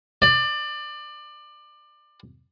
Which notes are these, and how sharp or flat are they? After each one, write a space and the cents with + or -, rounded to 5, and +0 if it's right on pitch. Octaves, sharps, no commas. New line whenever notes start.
D5 +25